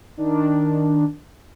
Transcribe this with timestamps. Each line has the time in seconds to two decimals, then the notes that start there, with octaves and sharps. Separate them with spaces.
0.17 D#3 D4